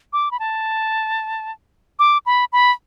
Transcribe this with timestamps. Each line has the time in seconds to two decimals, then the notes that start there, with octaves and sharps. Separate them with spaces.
0.13 D6
0.31 B5
0.40 A5
1.99 D6
2.26 B5
2.53 B5